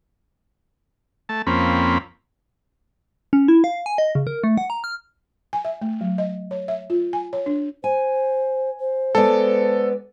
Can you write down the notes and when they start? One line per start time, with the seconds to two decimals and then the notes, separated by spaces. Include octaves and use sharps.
1.29 A3 A5
1.47 F2 A#3 C4 C#4 B5
3.33 C#4
3.48 E4
3.64 F5
3.86 G#5
3.98 D#5
4.15 C#3
4.27 A#4
4.44 A3
4.58 F#5
4.70 A#5
4.84 F6
5.53 G#5
5.65 E5
5.82 A3
6.01 F#3
6.18 D#5
6.51 C#5
6.68 E5
6.90 F4
7.13 G#5
7.33 C#5
7.46 D4
7.84 C5 G#5
8.80 C5
9.15 G#3 B3 A4 D5